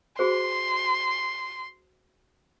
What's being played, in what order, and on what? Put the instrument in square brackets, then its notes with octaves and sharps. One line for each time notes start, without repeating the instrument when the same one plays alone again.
[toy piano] F#4 G#4 C5 [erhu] C6